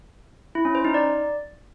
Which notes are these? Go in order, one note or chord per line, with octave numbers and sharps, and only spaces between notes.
E4
C#4
C5
D#4
D5